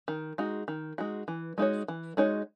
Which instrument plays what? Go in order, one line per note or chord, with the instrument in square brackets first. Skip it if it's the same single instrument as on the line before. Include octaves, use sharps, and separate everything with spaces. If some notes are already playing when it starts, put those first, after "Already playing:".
[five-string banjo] D#3
G#3 D#4 F#4
D#3
G#3 D#4 F#4
E3
G#3 D#4 F#4 C#5
E3
G#3 D#4 F#4 C#5